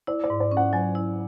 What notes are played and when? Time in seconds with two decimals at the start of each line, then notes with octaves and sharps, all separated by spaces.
0.07 E4 D5
0.24 D5
0.30 G#2
0.40 D5
0.51 C#4
0.57 F#5
0.73 F#3 G#5
0.95 E4